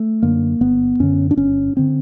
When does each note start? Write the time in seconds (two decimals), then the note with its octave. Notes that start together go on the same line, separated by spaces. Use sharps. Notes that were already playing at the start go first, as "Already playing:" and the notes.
Already playing: A3
0.23 F#2 D3 A#3
0.61 G1 B3
1.00 F#2 D3 C#4
1.31 D4
1.37 G1 C#4
1.77 D3 C4